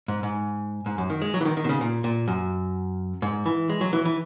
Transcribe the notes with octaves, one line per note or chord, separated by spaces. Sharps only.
G#2
G#2
G#2
F#2
D#3
G#3
F#3
E3
D#3
D#3
B2
C#3
A#2
A#2
F#2
G#2
E3
G#3
F#3
E3
E3